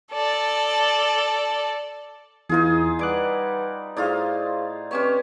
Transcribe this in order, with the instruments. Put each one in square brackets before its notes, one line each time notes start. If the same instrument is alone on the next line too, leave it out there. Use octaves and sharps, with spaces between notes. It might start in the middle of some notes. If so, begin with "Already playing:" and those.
[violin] A4 D5
[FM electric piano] E2 E3 [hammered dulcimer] D#4 F4 G#4
[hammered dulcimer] G3 [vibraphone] B4 F#5 [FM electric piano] G#5 D6 F#6
[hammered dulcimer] A2 D#4 F4 [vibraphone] G#4 C5 F5 [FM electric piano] D5
[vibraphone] C4 B4 C6 [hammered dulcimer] C#4 G4 C#5